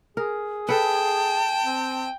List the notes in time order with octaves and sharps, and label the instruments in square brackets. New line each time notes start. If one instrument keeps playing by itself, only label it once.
[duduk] G#4 [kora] A#4
[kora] A4 B4 [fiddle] G5 [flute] A5
[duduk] C4